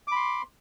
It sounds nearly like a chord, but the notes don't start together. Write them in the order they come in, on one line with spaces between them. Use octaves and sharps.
D6 B5 C6